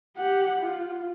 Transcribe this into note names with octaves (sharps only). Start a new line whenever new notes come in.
G4 F#5
F4